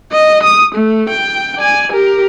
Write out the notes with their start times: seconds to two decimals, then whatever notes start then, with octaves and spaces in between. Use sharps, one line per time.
0.12 D#5
0.43 D#6
0.75 A3
1.09 G5
1.58 D5 G#5
1.92 G4 A#4